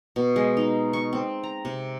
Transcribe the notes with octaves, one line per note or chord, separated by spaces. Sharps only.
B2
G#3
D#4
C#6
C4
A#5
C3